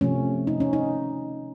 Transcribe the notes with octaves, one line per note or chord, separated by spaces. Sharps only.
C3 F3 A3 C#4
D#4
C#4
D#4